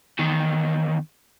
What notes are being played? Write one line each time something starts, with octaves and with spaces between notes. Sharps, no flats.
E2 D#3